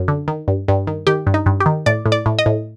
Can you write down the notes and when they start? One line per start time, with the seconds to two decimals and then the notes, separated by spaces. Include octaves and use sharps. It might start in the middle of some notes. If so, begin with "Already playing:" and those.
Already playing: F#2
0.08 D3
0.28 D#3
0.48 G2
0.68 G2
0.87 D#3
1.07 D#3 G4
1.27 G2
1.34 D#4
1.46 G2
1.60 G4
1.66 D#3
1.86 A2 D5
2.06 A2
2.12 D5
2.26 A2
2.39 D#5
2.46 A2